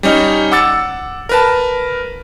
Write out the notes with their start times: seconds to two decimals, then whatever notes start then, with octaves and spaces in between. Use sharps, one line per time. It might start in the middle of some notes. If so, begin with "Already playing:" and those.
0.03 G3 C#4 D#4
0.52 F#5 D6 E6 A6 C#7
1.29 A#4 B4 A5